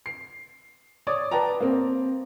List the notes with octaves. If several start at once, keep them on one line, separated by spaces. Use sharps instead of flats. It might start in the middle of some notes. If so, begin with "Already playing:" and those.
C7
C#5 D5 D#6
B4 D5 G5 A5 A#5
A#3 C4